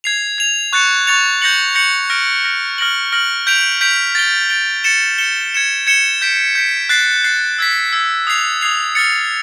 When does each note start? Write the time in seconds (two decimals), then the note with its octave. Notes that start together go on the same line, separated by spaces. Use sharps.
0.04 G#6 C7 F7
0.38 G#6 C7 F7
0.73 C#6 F#6 A6 C#7 F7
1.07 C#6 F#6 A6 C#7 F7
1.42 G6 A#6 C#7 F#7
1.75 G6 A#6 C#7 F#7
2.10 F6 A#6 D7
2.44 F6 A#6 D7
2.78 F6 A#6 D7 F#7
3.12 F6 A#6 D7 F#7
3.47 G6 B6 D7 F7
3.81 G6 B6 D7 F7
4.15 A6 D7 G7
4.49 A6 D7 G7
4.84 A6 C#7 E7 G7
5.18 A6 C#7 E7 G7
5.52 G#6 C#7 E7 G7
5.87 G#6 C#7 E7 G7
6.22 G6 B6 D7
6.55 G6 B6 D7
6.89 F#6 A6 C7
7.24 F#6 A6 C7
7.58 E6 G#6 B6
7.93 E6 G#6 B6
8.27 D#6 G#6 C7 F7
8.61 D#6 G#6 C7 F7
8.95 F6 A6 C#7